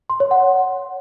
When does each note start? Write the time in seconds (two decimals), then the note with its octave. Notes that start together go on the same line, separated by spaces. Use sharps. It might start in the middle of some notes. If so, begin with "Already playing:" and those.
0.10 C6
0.20 C#5
0.31 F#5